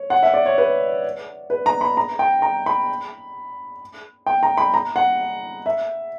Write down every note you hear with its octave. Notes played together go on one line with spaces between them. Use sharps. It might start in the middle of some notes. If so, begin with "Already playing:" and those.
Already playing: C#5
F#5
E5
D5
C#5
B4
B4
A#5
B5
A#5
G5
A#5
B5
G5
A#5
B5
A#5
F#5
E5